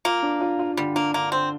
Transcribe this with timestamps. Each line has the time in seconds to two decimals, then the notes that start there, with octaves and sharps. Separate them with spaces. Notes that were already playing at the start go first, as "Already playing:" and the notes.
0.05 A#3 F4
0.23 D4
0.41 F4
0.59 F4
0.77 D3 G3
0.96 A#3 D4
1.14 D3 A#3
1.32 D3 C4